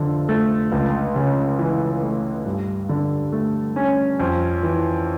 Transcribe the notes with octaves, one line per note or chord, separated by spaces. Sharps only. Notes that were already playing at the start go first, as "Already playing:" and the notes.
Already playing: F1 F2 D3
A3
C#2
C#3
E3
A3
G2
D3
A3
C#4
F2
E3